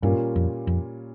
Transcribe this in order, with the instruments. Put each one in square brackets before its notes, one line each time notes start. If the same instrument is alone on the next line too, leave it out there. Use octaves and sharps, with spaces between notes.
[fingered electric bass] G2 [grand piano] A#2 G3 C#4 F4 A#4
[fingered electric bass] F2
F2